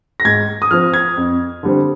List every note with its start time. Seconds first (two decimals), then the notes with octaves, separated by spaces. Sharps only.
0.20 A#6
0.25 G#2 G#6
0.62 D#6
0.71 F3 C4 F6
0.94 G#6
1.17 F2
1.63 D3 G3 C4